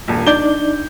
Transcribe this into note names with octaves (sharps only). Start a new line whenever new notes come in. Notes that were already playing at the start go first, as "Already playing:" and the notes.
D#1 A#1
D4 D#4 D5 G6 G7